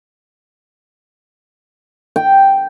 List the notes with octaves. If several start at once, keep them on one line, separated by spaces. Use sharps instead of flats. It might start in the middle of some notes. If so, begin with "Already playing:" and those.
G5